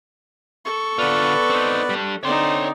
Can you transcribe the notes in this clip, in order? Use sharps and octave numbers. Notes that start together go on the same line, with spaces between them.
A4 C#6
D3 B3 F4 B4 D5
C4 D#4
G3 D4
D3 C4 D#4 C#5 D5 C6